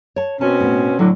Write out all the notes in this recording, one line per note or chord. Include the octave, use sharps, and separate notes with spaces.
C#5 A5
B2 C4 C#4 A5
A2 B3
A2 D3 F#3